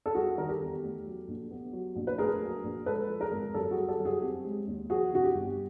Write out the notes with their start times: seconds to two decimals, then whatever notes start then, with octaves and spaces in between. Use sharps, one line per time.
0.06 A4
0.15 G3 F#4 G#4
0.37 D#3 A#4
0.49 G4 A4
0.60 E2
0.83 A3
1.06 F#3
1.28 A#1
1.51 B3
1.73 F#3
1.96 A#1
2.07 B4
2.18 A3 G#4 A#4
2.41 F#3
2.64 A#1
2.86 G#3 A4 B4
3.09 F3
3.20 G#4 A#4
3.31 G#1
3.54 F#2 G4 A4
3.71 F#4 G#4
3.77 G3
3.88 G4 A4
3.99 F#2
4.05 F#4 G#4
4.22 C4 G4
4.45 G#3
4.67 D#2
4.90 F3 F#4 G#4
5.13 C3 F#4
5.24 G4
5.35 G1